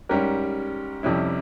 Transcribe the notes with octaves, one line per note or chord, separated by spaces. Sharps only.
G#2 G3 C#4 G4 A#4
F2 C3 G3 C#4 E4